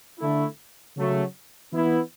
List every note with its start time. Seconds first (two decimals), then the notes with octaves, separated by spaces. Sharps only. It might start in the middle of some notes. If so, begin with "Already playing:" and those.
0.19 D3 A3 E4
0.96 C#3 F#3 A3
1.73 E3 B3 E4